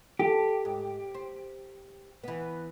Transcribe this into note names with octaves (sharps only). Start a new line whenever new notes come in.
G4 A4
G#2
C5
E3 B3